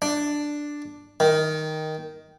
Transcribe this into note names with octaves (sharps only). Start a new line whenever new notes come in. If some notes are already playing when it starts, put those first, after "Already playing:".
D4
D#3